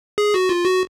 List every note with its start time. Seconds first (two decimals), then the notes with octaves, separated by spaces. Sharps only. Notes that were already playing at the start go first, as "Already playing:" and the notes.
0.18 G#4
0.34 F#4
0.49 F4
0.65 F#4